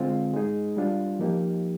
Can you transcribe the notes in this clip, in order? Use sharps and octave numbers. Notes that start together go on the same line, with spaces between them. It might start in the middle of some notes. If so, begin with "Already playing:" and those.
Already playing: D3 G#3 C4 F4
G#3 D#4 G#4
G3 D4 F4
F3 A#3 D#4 G4